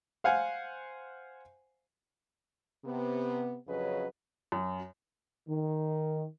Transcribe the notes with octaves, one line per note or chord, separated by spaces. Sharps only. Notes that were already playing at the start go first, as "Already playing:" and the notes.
C5 F5 F#5 G#5
C3 B3
F2 C#3 F#3 C#4 B4 D#5
F#2
D#3